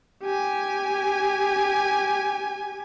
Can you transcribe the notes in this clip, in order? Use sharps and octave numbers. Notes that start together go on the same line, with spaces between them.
G4 G#5